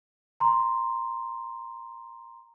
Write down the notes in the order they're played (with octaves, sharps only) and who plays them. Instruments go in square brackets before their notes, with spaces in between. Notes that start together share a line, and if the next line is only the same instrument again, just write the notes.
[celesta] A#5 C6